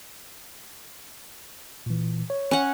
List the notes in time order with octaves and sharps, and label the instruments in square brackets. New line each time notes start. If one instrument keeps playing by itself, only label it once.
[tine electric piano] A#2 E3
C#5
[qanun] C#4 F#5